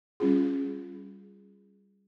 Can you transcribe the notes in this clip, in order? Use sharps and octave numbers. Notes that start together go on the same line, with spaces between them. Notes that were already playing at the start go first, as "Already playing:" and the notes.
G3 C#4 F4 G#4